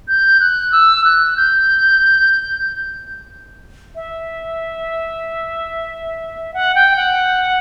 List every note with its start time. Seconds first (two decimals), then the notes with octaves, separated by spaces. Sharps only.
0.08 G6
0.40 F#6
0.72 E6
1.04 F#6
1.37 G6
3.95 E5
6.54 F#5
6.75 G5
6.96 F#5